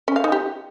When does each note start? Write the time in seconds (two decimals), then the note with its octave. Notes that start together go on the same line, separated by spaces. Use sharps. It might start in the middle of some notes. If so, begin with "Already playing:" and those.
0.08 C#4
0.16 F5
0.24 D#4
0.32 G4